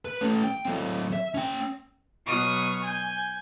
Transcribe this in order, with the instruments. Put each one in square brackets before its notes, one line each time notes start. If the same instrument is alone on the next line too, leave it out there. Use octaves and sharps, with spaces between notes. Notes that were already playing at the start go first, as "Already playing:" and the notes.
[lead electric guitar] B4
A3 C#4
G5
F#3 C4
E5
C#4 G5
[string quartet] B2 F#3 C#6 D#6 F6
G#5 G6